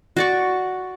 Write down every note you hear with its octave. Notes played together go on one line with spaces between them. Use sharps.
F#4 D5 C#6